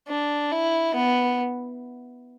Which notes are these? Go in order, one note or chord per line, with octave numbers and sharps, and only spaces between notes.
D4
E4
B3